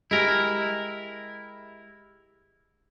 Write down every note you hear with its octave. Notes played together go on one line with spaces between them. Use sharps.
G#3 E4 G4 A#4